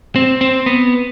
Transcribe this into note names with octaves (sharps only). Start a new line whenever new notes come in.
C4
C4
B3